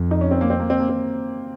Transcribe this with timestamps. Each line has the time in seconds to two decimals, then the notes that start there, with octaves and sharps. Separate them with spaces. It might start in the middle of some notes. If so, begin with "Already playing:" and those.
Already playing: F2
0.11 D#4
0.21 C#4
0.31 C4
0.41 A#3
0.50 C4
0.60 A#3
0.70 C4
0.80 A#3
0.89 C4